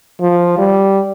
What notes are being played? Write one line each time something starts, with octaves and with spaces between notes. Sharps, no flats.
F3
G3